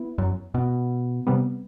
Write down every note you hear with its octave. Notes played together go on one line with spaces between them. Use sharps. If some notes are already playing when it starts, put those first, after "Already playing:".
Already playing: B3 E4
F#2
B2
C3 G3 B3